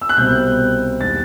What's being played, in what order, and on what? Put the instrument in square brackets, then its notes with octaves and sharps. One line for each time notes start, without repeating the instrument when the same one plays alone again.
[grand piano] E6
F#6
C2 B2 G3 C4 G6
E2 D#3 G3 A6